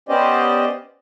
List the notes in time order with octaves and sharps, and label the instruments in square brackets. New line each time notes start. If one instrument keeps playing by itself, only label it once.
[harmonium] B3 C#4 G4 C5 D5 D#5